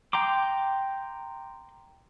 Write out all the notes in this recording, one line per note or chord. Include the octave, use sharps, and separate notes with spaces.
G5 A#5 C6 D6